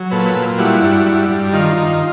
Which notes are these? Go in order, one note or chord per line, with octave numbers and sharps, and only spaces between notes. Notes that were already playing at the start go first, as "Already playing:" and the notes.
Already playing: F#3
A#2 A4 B4
A#2
G3 E4 F#4
G2
G3
G2
D#3 D#4 F4
D#3